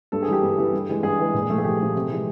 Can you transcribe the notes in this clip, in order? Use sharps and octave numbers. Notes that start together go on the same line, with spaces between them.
G2 A4
G#4
E3 G3 G4
G2
E3 G3
G2
E3 G#3
G2 G#4
E3 G#3
A#2
F3 A3
G#4
A#2 G4
F3 A3
C3
E3 G#3